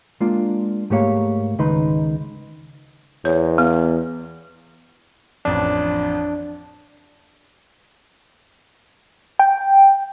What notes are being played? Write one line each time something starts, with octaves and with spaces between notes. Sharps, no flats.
G#3 A#3 D4 F4
G#2 A3 A#3 G4 C#5 F5
C#2 D#3 D#4 B4 C6
E2 C#5
B3
A1 F2 D4
G5